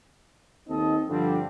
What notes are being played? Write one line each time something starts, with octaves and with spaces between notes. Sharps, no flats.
D#2 C4 D#4 A4 D#5
G2 D3 F3 G3 C4 D4